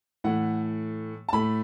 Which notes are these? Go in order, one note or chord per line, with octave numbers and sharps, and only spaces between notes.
A2 E3 A3 F#5
A5
A2 A3 B5